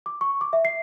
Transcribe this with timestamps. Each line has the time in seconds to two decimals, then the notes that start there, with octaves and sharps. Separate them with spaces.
0.06 D6
0.21 C#6
0.41 D6
0.53 E5
0.65 C7